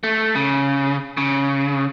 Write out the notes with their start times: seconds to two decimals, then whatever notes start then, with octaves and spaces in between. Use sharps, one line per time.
0.04 A3
0.36 C#3
1.17 C#3